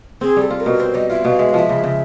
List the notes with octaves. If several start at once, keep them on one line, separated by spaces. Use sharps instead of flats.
C4 G#4
G3 A4
F4
A#4
B2
C4 C5
G3 D#5
F4 E5
B2 F5
G#3 E5
F3 F5
E5
C#3
C#3